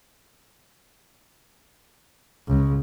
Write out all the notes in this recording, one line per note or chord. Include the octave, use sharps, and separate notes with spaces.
C#2